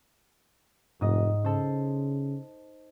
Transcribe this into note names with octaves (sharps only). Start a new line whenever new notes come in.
F1 G#2 D#5
C#3 A4 C5